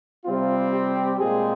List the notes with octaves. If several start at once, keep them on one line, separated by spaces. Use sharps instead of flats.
C3 G3 C4 F4
G4
A#2 G#3 C4 G#4